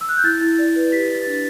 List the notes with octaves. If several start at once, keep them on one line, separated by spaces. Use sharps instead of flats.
E6
F#6
G6
E4 A6
E4
D5
B4
G4 B6
A6
B4
A6
D4